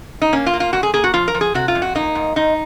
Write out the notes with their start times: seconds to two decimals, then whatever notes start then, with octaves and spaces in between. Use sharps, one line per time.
0.22 D#4
0.33 A#3 C#4
0.46 F4
0.53 A#3
0.60 F4
0.73 F2 F#4
0.83 G#4
0.94 A#3 G#4
1.04 F#4
1.14 F3 F4
1.28 A#4
1.34 F3
1.41 G#4
1.54 C3 F#4
1.68 F4
1.75 F2
1.82 F#4
1.95 A#3 D#4
2.15 G#2
2.36 G#2 D#4